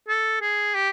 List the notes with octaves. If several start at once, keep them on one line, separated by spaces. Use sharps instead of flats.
A4
G#4
G4